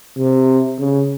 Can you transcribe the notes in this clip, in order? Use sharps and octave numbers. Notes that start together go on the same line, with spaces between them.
C3
C#3